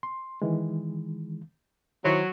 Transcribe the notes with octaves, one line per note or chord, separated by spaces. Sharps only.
C6
D#3 E3 G#3
D#3 F#3 E4 C5